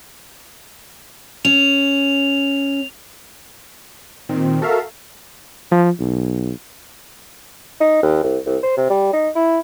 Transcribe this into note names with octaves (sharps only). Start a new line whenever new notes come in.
C#4 F7
A#2 D#3 C4
F#4 A4 A#4 E5 F5
F3
B1
D#4
D#2
C2
C2
C5
C3
G3
D#4
E4